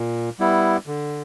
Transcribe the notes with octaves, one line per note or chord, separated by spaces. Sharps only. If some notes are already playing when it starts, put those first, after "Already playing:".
Already playing: A#2
G3 B3 E4
D3